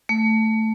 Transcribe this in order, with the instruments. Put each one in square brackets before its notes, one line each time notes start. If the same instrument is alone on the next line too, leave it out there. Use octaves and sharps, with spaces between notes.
[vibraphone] A3